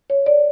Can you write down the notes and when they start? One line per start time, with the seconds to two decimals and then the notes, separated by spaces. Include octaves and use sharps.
0.10 C#5
0.26 D5